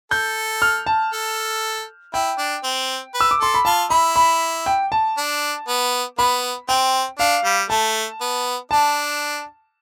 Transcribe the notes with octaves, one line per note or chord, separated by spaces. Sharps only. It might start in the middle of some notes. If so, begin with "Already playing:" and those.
A4 G6
F6
A5
A4
E4 G5
D4
C4
B4
E6
D6
A4 C6
B5
F4 A5
E4 B5
B5
G5
A5
D4
B3
B3 B5
C4 G5
D4 F5
G3
A3 A5
B3
D4 A5